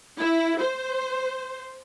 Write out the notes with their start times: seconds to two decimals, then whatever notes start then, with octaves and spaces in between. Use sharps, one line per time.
0.20 E4
0.60 C5